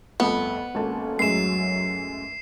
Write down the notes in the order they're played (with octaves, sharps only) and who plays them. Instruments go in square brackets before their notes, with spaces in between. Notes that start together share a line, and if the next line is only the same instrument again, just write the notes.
[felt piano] G1 F2 A3 [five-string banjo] B3
[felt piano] G#1 A5 [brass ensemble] A#3 C#4 A4
[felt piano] F#2 A2 G#3 [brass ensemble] F#3 [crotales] C7 E7